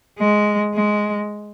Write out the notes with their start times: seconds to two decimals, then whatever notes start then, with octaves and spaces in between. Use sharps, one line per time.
0.19 G#3
0.74 G#3